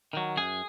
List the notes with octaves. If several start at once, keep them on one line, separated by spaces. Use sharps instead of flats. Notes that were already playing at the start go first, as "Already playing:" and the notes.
D#3 F#3
F#2 G#4